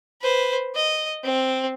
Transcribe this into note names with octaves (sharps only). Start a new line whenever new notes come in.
B4 C5
D#5
C4